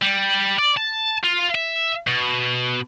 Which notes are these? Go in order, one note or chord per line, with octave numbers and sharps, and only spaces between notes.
G3
D5
A5
F4
E5
B2